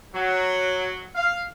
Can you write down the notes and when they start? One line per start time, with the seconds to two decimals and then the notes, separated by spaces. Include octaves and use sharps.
0.14 F#3
1.15 F5